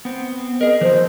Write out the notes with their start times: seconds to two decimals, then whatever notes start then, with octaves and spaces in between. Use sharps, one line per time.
0.05 B3 C4
0.61 G#4 A#4 D#5
0.81 E3 F3 C5